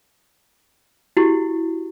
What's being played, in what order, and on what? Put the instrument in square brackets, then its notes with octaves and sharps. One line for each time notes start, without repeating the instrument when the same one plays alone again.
[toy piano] E4 F#4 G4